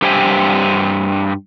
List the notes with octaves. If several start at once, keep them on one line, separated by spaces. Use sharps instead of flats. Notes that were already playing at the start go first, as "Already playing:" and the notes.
G2 G4 C5 E5 G5 G#5